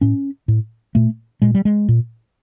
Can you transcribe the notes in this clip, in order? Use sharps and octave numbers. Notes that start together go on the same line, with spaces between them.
A2 C#4
A2
A#2 A3
A#2 G#3
G3
G#3
A#2